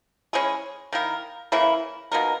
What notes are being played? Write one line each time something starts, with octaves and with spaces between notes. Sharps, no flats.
G#3 C#4 E4 G#4
D#3 A#3 E4 A#4
C#3 E3 A#3 E4
B2 A#3 D#4 A#4